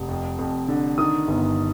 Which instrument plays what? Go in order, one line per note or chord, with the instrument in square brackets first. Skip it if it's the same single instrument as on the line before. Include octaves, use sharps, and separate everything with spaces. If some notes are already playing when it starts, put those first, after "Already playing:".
Already playing: [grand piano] F1
F2
F2
D3
D#3 D#6
G1